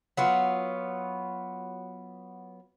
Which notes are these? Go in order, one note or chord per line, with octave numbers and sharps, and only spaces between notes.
F#3 B3 F4